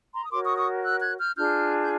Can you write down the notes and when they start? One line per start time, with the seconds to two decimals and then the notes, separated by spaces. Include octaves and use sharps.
0.14 A#5 C6
0.24 D#6
0.31 F#4 A#4 C#5 C6 D6
0.44 C#6 D#6
0.58 C#6 D#6
0.84 E6 F#6
1.01 F#6 G#6
1.19 F6 G6
1.36 D4 F4 G#4 F6 G6
1.82 G6